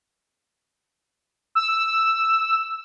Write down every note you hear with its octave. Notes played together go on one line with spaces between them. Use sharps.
E6